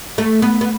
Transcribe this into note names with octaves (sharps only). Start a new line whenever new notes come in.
A3
B3
B3